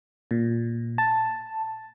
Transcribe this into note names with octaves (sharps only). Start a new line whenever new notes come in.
A#2
A5